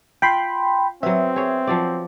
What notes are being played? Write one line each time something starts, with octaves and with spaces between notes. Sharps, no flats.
F4 G5 B5 C6
F#3 B3 C4 E5
G#4 C#5
F3 F#3 D5